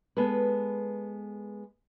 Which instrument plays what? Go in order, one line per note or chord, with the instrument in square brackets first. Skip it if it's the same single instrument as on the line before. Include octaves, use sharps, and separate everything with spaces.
[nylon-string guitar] G#3 B3 A4 B4